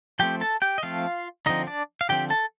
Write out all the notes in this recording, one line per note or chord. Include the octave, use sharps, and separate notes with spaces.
F3 A3 C4 G4 G5
A4 A5
G4 G5
D#5
F3 A3 C4 F4 F5
D3 F3 C4 D#4 D#5
D4 D5
F5
D3 F3 C4 G4 G5
A4 A5